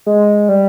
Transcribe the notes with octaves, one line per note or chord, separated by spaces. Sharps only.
G#3
G3